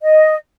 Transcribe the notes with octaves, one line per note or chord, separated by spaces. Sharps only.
D#5